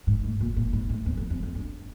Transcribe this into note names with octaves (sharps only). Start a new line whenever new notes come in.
G#2
A2
A#2
A2
G#2
A2
E2
F2
F2
F2
G2